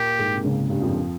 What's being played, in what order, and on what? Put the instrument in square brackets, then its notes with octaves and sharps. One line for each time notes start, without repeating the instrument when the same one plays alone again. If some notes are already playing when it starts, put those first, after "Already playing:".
Already playing: [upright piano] A#2 A#3 [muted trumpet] G4
[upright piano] G#2 G#3
C3
C#2 C#3
G2 G3
F2 F3